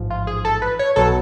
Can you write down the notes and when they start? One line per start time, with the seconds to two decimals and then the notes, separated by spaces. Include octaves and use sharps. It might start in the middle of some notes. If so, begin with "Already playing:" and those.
Already playing: A1 G#2 F3
0.10 F4
0.27 G#4
0.45 A4
0.62 B4
0.79 C#5
0.96 B1 B2 F#3 A4